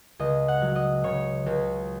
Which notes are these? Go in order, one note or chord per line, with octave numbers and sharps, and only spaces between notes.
C#2 D#5
F#5
F#3
D#5
C#3 C#5
C#2